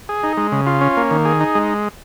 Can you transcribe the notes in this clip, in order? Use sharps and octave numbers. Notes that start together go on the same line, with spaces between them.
G#4
D#4
G#3
C#3
F4
C#4
A#3
D#3
G#4
D#4
G#3